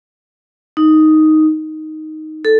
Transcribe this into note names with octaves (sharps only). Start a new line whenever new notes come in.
D#4
A4